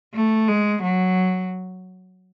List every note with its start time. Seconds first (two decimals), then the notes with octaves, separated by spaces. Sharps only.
0.15 A3
0.48 G#3
0.83 F#3